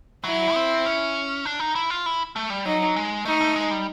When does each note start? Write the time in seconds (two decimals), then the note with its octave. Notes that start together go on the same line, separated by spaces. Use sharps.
0.24 F#3 E4
0.54 C4
0.85 C#4
1.45 D4
1.60 D#4
1.75 E4
1.90 F4
2.06 E4
2.36 A3
2.50 G3
2.65 F#3 D#4
2.96 G#3
3.25 A3 D#4
3.41 A3
3.56 G#3
3.71 G3